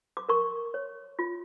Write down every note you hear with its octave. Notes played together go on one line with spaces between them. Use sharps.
D6
A#4 C#6
C#5
F4